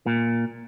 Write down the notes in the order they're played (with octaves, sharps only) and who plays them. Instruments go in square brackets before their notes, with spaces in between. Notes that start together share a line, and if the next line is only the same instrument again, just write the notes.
[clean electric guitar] A#2